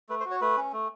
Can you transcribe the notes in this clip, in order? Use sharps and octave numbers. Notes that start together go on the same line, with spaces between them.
A3 B4
C5
F#4
C#5
A3 B4
C#4
A3